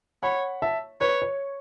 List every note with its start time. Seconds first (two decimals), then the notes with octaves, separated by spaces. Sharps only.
0.23 C#5 F#5 B5
0.62 E5 A5
1.01 B4 C#5
1.22 C#5